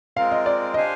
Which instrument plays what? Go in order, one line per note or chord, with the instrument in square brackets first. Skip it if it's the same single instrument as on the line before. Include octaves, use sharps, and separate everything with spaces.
[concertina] G#3 C4 F4 A#4 [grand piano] F5
[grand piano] D#5
D5
[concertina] D4 G4 C5 F5 G#5 [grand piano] D#5